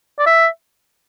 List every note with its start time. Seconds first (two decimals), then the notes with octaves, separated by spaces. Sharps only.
0.19 D5
0.26 E5